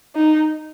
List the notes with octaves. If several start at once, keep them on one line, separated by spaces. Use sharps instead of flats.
D#4